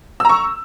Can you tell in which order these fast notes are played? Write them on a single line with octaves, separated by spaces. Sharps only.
E6 A#5 C#6